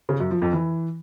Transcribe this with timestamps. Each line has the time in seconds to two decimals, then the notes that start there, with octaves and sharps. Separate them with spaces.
0.09 C#3
0.20 F#2
0.31 F3
0.42 F2
0.53 E3